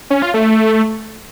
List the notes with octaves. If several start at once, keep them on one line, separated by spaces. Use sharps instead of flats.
C#4
F4
A3